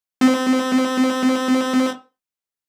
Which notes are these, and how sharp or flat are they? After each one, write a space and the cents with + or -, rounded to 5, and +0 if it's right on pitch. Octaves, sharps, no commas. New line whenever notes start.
C4 -25